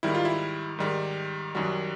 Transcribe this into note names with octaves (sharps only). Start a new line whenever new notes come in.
G#2 D#3 G3 E4
F4
E4
G#2 D#3 G3
F#2 D#3 G3 F#4